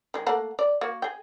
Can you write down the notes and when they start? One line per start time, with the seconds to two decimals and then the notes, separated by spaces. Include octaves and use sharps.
0.14 D#3 G#3
0.26 A3 A#3 F#5
0.59 D5
0.81 A#3 F#4
1.02 G#4 G5